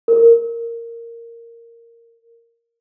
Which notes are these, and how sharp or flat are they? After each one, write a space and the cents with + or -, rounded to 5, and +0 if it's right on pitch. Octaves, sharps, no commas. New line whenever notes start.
A#4 -10